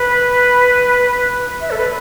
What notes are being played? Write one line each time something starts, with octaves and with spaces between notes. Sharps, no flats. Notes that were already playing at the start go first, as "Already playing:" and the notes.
Already playing: B4
E5
A4
B4